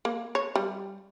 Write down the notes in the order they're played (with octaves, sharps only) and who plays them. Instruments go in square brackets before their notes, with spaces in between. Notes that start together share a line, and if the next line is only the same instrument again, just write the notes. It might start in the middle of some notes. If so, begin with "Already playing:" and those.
[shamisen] A#3
C#5
G3